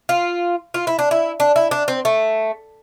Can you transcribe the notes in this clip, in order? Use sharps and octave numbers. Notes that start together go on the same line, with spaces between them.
F4
F4
E4
D4
E4
D4
E4
D4
C4
A3